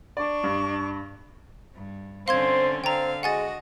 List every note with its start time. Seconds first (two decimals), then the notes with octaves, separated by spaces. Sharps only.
0.17 D4 D5 C#6
0.44 G2
1.74 G2
2.28 D3 C4 C#4 C5 F5 C6 G#6
2.84 D3 C4 F5 G5 A#5
3.23 G#3 F#4 D#5 F#5 G#5 A6